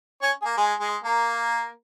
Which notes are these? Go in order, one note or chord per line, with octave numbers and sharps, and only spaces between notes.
C#4 C#5
G#4
A#3 A#4
G#3 G#4
G#3 G#4
A#3 A#4